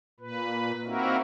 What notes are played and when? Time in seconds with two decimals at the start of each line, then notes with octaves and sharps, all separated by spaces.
0.20 A#2 B4
0.85 A#3 C4 D#4 E4 F#4 A#4